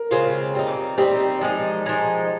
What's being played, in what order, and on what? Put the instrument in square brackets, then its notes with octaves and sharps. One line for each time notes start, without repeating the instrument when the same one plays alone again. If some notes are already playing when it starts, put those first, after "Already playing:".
Already playing: [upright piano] A#4
[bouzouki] C#3 G#3 C4 F4
G3 C4 D#4
[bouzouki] G3 C4 D#4 [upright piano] G4
[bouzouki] F3 G#3 D#4
F3 G#3 D#4